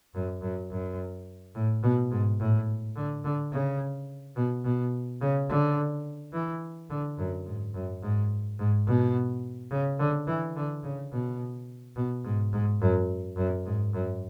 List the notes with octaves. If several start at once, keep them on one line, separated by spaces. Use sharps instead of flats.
F#2
F#2
F#2
A2
B2
G#2
A2
D3
D3
C#3
B2
B2
C#3
D3
E3
D3
F#2
G#2
F#2
G#2
G#2
B2
C#3
D3
E3
D3
C#3
B2
B2
G#2
G#2
F#2
F#2
G#2
F#2